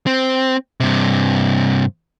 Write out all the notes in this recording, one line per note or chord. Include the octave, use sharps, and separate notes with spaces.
C4
G2 C3